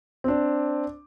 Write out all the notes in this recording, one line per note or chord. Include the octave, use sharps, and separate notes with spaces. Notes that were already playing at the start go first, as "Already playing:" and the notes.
C4 D4